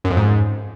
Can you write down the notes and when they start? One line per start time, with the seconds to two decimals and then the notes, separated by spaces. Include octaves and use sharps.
0.04 F#2
0.11 F2
0.17 G#2